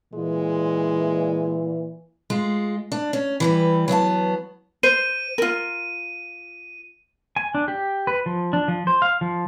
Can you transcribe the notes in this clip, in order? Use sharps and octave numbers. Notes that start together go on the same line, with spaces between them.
A#2 E3 G#3
G#3 F4
D4
C#4
E3 G3 B4
F#3 B3 E5 A5
C5 D#7
F4 A#4
G#5
D4
G4
B4
F3
D4
F3
C5
F5
F3